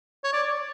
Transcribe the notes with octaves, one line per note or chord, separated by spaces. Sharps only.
C#5
D5